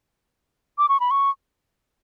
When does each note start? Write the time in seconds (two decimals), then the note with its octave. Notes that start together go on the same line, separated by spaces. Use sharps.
0.78 D6
0.89 C#6
1.00 B5
1.11 C#6